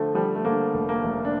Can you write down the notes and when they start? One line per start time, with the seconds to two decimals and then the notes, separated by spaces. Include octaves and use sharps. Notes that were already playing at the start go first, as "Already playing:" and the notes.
Already playing: D3 F3 A3
0.15 F3 G3
0.35 A3
0.45 D3 A#3
0.74 F1
0.89 A#3
1.03 F1
1.25 D4